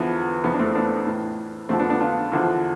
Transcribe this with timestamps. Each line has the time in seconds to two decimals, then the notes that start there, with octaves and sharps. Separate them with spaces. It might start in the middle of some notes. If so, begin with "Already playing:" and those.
Already playing: E2 D3 F3 B3
0.44 F2 E3 B3
0.54 D4
0.59 A3 C4
0.75 B3 D4
1.07 A2 E3
1.69 F2 D3 F3 A3 C4
1.79 B3 D4
1.90 B3 D4
2.00 D4 F4
2.32 E2 D3 F3